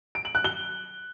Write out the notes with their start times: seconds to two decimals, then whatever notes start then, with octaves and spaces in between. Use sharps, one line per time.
0.15 D7
0.25 F#7
0.35 F#6
0.45 G7